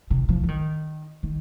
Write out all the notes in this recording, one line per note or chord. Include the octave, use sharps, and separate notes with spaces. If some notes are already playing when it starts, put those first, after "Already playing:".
C3
F3
F3
D#3
D#3